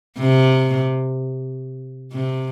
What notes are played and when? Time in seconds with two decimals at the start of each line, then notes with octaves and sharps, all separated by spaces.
0.18 C3
2.13 C3